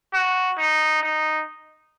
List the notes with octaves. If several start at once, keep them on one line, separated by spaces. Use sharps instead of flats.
F#4
D#4
D#4